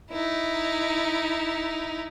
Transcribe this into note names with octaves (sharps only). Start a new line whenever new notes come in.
D#4 E4